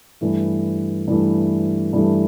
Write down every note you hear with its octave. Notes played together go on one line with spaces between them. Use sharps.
G2 E3 A3
G2 E3 A3
G2 E3 A3